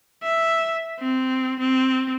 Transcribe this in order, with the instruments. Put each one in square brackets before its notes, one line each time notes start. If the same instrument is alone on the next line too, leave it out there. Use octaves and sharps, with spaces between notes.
[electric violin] E5
C4
C4